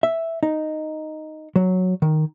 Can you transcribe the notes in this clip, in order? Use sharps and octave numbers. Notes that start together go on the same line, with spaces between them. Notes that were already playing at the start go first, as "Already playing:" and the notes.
E5
D#4
F#3
D#3